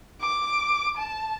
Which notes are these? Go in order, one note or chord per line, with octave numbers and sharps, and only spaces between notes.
D6
A5